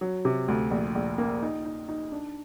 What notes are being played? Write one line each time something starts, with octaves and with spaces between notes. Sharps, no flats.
F#3
C3
D2
A#1
A#1
A#3
D#4
D#4
D#4
D4